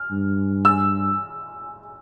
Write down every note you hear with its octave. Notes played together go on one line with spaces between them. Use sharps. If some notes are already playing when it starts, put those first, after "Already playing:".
Already playing: F6
G2
E6